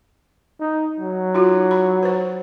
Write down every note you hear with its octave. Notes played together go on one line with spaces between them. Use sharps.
D#4
F#3
D#4 F4 F#4
B5
B4 C5